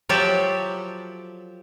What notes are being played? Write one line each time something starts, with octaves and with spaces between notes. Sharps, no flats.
F3 F#3 G4 A4 E5